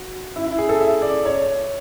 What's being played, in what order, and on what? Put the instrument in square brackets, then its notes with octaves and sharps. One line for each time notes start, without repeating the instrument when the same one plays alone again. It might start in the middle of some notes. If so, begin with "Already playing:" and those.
Already playing: [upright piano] F#4
E4
E4
G#4
A4
E5
D5
C#5